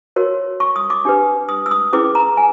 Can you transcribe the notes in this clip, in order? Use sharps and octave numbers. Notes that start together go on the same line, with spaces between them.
F#4 A#4 C#5
C#6
D#6
D6
D4 G4 B4
D#6
E6
D#6
C#4 E4 G#4 B4 D6
A#5
G#5